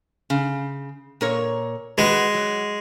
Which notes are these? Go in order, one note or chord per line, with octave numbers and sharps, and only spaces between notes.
C#3
A#2 A#4 C#5
G#3 F#4 B4
F#3